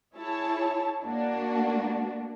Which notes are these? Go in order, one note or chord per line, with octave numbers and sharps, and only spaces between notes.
E4 G#4 C#5 A5
A#3 D4 F#4